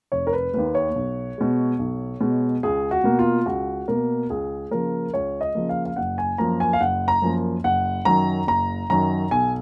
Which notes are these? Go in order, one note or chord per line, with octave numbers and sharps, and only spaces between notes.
F1 C#5
A#4
B4
D#2 D#3 A#3 B4
C#5
B1
B2 G#3
B1
B2 G#3
C#2 G#4
F#4
B2 A#3
F4
C#2 F#4
B2 A#3 A#4
C#2 G#4
C#3 F3 A#3 A#4
C#2 C#5
D#5
C#3 F3 A#3
F5
F5
F#1 F#5
G#5
F#2 F3 A#3 A#5
G#5
F5
F#1 F#5
A#5
F#2 F3 A#3
F#1 F#5
F#2 D#3 F#3 A#5
F#1 A#5
F#2 D#3 F#3 A#5
B1 G#5